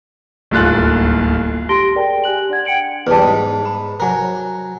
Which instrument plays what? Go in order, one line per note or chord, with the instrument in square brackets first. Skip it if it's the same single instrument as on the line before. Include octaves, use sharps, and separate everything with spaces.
[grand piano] D1 G1 D#2 F4 F#6 A6
[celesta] G4 A5 C6 A#6 D7 G7
G#4 A#4 D5 G5 A5
G4 G#5 F#6 F#7
D4 D5 F#5 G#6
F#5 G5 C#7 D7 F#7
[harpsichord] E2 G3 [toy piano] B4 C#5 A5
[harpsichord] G#2
[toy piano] B5
[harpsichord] F#3 A#4 [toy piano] C5 G#5